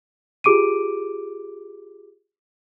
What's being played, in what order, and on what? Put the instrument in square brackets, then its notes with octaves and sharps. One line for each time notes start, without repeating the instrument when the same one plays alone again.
[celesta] F4 G4 G#4 D6 D7 D#7